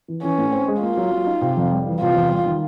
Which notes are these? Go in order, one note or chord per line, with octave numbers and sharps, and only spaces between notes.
E3
E3 C#4
A2
C4
G#3
A#3 F4
F#3
F#3
D#4
C3
F2
G3
E3
C3 F4
E2
G3
D#3